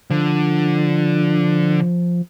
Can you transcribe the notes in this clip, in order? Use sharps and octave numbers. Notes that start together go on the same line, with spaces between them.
D3 F3